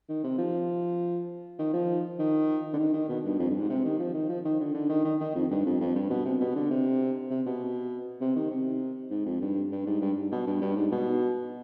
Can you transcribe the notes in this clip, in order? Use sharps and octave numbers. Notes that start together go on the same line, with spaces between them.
D#3
C3
F3
D#3
F3
D#3
D3
D#3
D#3
B2
G2
F2
G2
G#2
C3
D#3
F3
D#3
F3
D#3
D3
D3
D#3
D#3
D#3
F2
G2
F2
F2
G2
B2
C3
B2
D3
C3
C3
B2
C3
D#3
C3
G#2
F2
G2
G2
G#2
G2
B2
G2
G2
G#2
B2